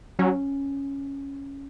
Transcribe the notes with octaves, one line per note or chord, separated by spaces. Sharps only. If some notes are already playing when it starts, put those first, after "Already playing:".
F#3 C#4